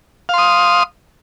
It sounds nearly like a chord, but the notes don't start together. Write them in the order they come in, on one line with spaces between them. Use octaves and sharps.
F5 C6 D#6